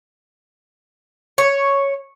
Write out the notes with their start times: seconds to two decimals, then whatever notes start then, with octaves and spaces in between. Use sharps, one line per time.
1.38 C#5